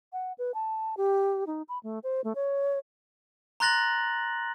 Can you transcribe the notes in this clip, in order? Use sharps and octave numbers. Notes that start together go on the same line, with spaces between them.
F#5
B4
A5
G4
D#4
B5
A3
C5
A3
C#5
A#5 C6 F#6 A6 A#6 F#7